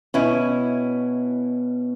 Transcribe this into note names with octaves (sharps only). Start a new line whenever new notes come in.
B2 C#4 E4